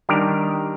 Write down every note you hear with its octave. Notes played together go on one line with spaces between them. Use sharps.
D#3 G3 D4 G4 A#4